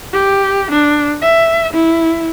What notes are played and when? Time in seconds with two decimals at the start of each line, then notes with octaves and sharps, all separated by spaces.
0.13 G4
0.71 D4
1.22 E5
1.73 E4